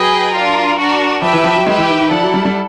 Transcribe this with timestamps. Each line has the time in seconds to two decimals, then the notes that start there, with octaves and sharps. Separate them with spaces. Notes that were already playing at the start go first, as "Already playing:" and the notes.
Already playing: F#3 G#4 B4 D#5 G5
0.32 D4 F4 A#4
0.77 D4 F#4 A#4
1.22 F3 G4 B4 E5 G5
1.33 E3
1.44 F3
1.56 F#3
1.66 G#3 G4 B4 E5 G5
1.78 E3
1.90 D#3
2.00 D#3
2.11 F3 E4 A4 D5 F#5
2.23 F#3
2.34 G3
2.45 G3